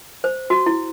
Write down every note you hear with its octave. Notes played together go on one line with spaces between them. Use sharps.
C5
F#4
E4